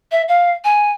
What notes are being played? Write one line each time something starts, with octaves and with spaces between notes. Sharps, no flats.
E5
F5
G#5